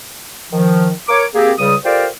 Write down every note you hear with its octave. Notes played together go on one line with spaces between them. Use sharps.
D#3 F3
A#4 C#5 D6
A#3 C4 G4 G#4
C#2 C#3 G3 D#6
F4 G4 A4 A#4 C5 D5